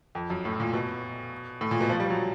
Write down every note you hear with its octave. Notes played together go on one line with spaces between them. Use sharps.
F2
F#2
A2
A#2
B2
A2
A#2
B2
F3
G3
F#3